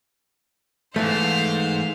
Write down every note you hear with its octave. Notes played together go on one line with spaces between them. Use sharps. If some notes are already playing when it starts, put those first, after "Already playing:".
E2 G#2 E3 A3 C5 F5